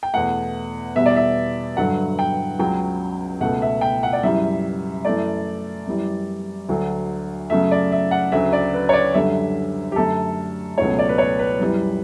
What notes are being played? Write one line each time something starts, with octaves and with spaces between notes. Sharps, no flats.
G5
E2 B2 A3 F#5
E2 B2 G3 E5
D5
E5
G2 D3 F#3 F#5
G5
C#2 C#3 F#3 G5
C#2 B2 A3 F#5
E5
G5
F#5
D5
F#2 C#3 E3 G3 E5
F#2 E3 A3 D5
F#2 E3 G3
D2 D3 F#3
F#2 C#3 F#3 A3 E5
D5
E5
F#5
D2 C#3 F#3 E5
D5
B4
C#5
D5
F#2 D3 G3 E5
G4
F#2 D3 A3 A4
C#2 B2 F#3 A3 C#5
D5
B4
C#5
B4
F#2 E3 G3